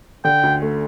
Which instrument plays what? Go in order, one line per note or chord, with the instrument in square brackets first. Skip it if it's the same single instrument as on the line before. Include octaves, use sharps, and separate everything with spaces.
[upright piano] D3 [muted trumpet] G5
[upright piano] D2
A3